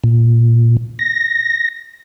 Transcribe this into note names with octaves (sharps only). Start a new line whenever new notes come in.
A#2
A#6